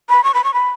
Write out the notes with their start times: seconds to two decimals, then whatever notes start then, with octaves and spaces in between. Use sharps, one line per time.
0.09 B5
0.24 C#6
0.34 B5
0.44 C#6
0.54 B5